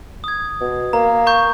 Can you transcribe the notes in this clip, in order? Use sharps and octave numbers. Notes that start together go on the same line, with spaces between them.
D#6 G#6
B2
A#3 A#5
A#5 C#6 G6